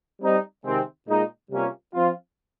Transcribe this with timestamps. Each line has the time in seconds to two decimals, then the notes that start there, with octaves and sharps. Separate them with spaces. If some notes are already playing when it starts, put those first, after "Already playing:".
0.21 G3 C4 D#4
0.65 C3 D#3 G#3 C4
1.07 A#2 G#3 D#4
1.51 C3 G3 A#3 C#4 F4
1.93 F3 C4 F4